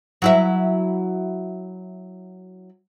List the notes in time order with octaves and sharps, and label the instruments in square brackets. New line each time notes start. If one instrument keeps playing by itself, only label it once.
[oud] F#3 E4 E5